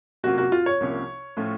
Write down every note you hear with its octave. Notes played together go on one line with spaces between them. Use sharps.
C3 F#3 A#3 C#4 F4 F#4
F#4
F4
C#5
C2 C3 F3 A#3 C#4
A2 F3 A3 C#4 F4